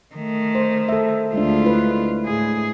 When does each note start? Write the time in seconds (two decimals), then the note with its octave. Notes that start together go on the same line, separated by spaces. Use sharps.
0.15 D#3 A3
0.55 C5
0.89 A4 E5
1.34 D2 G#3 D4 F4
1.63 E4 B4
2.26 A2 G#4